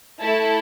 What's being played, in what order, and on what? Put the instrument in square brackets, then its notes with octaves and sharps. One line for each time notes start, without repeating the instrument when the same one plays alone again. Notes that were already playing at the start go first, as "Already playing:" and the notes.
[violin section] A3 E4 A4 A5